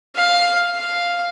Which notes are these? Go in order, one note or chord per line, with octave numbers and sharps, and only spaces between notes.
F5
F5